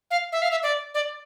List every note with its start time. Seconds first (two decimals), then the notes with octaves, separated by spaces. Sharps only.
0.11 F5
0.32 E5
0.42 F5
0.51 E5
0.63 D5
0.94 D5